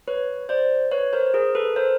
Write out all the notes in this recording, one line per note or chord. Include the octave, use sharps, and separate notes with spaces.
B4 C#5
C5 D5
B4 C#5
A#4 C5
G#4 A#4
A4 B4
A#4 C5